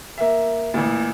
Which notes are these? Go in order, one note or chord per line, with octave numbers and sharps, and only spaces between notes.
A#3 E5
A1 A#2